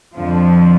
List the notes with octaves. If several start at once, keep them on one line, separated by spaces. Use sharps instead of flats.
F2 D3 F3